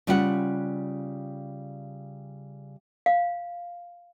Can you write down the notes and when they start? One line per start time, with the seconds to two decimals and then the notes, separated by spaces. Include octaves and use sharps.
0.07 C#3 G3 F4 B4 D#5 F#5
3.06 F5